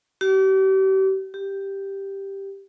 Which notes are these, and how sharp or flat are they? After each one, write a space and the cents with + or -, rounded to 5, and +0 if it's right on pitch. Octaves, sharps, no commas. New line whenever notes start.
G4 -40
G4 +0